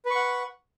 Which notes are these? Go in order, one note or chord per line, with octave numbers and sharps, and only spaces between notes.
B4 F#5 C#6